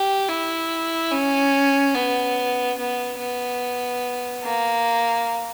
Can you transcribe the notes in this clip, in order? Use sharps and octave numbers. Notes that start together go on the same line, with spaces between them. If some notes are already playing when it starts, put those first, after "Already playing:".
Already playing: G4
E4
C#4
B3
B3
B3
A#3